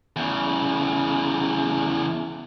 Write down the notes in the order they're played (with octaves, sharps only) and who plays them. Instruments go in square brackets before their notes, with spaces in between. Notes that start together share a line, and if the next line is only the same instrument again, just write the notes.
[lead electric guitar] E2 C#3